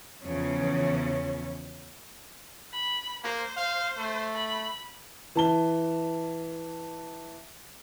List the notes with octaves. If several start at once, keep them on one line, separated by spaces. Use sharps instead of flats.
E2 C#3 F3 C#4
B5
A#3 C5
F5
A3
B5
E3 A5 G7